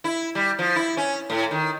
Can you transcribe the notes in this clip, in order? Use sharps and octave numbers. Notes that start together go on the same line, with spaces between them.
E4
G3
F3
E4
C#4
A2
D#3